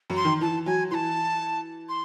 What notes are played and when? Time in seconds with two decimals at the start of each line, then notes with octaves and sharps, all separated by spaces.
0.10 F#2
0.17 C6
0.25 D#3
0.41 E3 A5
0.66 F#3 G#5
0.91 E3 A5 C6
1.89 C6